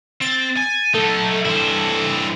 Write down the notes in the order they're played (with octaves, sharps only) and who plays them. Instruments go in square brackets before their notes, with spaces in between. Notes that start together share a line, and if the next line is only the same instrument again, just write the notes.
[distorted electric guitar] C4 [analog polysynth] A6
[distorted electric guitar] G#5
[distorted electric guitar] F#3 D#4 [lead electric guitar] A3 [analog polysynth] A4
[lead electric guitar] G2 E3 [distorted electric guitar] E4 C5